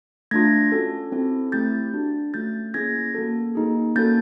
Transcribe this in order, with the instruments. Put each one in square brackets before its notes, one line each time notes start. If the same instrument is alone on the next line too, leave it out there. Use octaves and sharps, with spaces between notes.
[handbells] A3 D4 F4 G#6 A#6
C#4 F#4 A4
C4 E4 A4
A3 C4 E4 G4 G6 A6
D4 F#4 A4
A3 C#4 F4 A4 G6 A6
A#3 C#4 E4 G#4 G#6 A#6
A#3 C#4 F#4 A4
A#3 D#4 G#4
A#3 C#4 F#4 A4 G6 A6